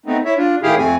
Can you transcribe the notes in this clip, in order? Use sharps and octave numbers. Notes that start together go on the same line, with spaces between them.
A3 B3 C4 D#4
E4 C#5 E5
D4 F4
A2 D#3 E4 G4 G#4 F5
F2 A3 C4 G#5